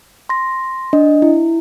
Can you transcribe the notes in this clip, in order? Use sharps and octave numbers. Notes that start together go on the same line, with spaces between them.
C6 A#6
D4 D#5
E4